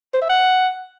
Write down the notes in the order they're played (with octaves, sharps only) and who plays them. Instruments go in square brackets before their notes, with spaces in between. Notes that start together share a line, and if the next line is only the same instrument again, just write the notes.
[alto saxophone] C5
E5
F#5